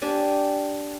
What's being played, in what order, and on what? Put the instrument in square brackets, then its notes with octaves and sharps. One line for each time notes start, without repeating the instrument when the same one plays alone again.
[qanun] D4 G4 D5 G#5